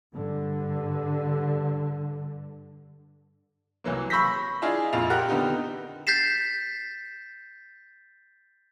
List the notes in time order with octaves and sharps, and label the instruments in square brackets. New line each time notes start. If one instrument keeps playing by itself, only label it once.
[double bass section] G2 D3
[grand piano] C2 E3 F#3 A#3
B5 C#6 E6 G6 A#6 B6
D4 E4 F4 G#4 D#5
A#1 F2 F4 F7
G4 A#4 F#5 G5 F6 F#6
D3 B3 D#4 G4
[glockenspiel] G6 A6 B6 C7 E7